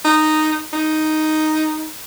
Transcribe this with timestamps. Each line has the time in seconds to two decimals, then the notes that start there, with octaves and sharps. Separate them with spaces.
0.05 D#4
0.73 D#4